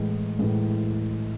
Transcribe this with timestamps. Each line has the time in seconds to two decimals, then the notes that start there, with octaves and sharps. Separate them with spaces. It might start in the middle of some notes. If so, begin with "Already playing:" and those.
Already playing: A2 E3 G#3
0.39 A2 E3 G#3